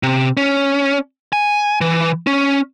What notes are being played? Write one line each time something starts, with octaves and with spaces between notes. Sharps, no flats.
C3
C#4
G#5
E3
C#4